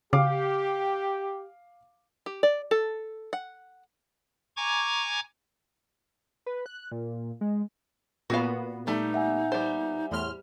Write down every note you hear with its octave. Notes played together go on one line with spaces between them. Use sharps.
C#3 G4 F5 D6
G4
D5
A4
F#5
G#5 A#5 C#6 D6 G#6
B4
F#6
A#2
G#3
A#2 B3 F#4 F5
G3 A3 D#4
E5 F#5 G#5
G3 C5
E2 A2 C6 F6